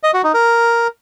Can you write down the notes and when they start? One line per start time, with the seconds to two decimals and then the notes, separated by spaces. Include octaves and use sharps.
0.03 D#5
0.14 F#4
0.24 D#4
0.34 A#4